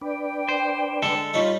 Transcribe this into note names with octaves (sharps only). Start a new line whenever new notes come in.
D4 B4 D5 G5
C5
D3 G#3 A4
A2 G3 D#4 F4 C#6